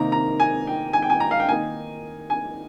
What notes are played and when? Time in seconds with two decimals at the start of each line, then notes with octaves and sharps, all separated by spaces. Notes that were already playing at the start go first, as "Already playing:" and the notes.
Already playing: C3 D#3 A#3 D#4 A#5
0.12 A#5
0.40 G#5
0.67 G5
0.93 G#5
1.02 G5
1.10 G#5
1.20 A#5
1.31 F5
1.40 G5
1.48 D#3 A#3 D#4 G#5
2.30 G#5